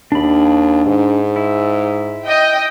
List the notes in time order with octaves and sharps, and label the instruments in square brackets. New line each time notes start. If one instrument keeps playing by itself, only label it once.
[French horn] D#2 [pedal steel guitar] D4 B5
[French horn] G#2
[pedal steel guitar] E4
[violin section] D#5 G5